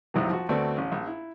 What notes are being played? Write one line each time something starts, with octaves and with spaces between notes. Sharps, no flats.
A#1 F2 C3 D#3 E3 F#3
F3 F#4
D2 A3 B3 C4 F#4 D5
A1 C#4
A#1
E4